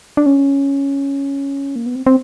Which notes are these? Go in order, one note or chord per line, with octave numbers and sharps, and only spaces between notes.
D4
C#4
A#3
B3
C4
C4